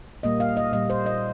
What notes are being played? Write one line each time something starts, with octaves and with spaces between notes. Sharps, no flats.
A#2 G3 A#3 D#5
F5
D#5
A#2 G3 A#3 D#5
C5
D#5